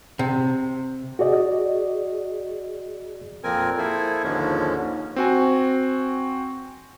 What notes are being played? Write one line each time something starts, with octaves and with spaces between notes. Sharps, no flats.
C3
F#4 G#4 D5 D#5
F2 A#2 F3 C4 A#4 G#5
A#3 E4 G#4 A4 C5 G#5
D#2 G#2 D3 F3 G#3 C#4
C4 F#4 G#5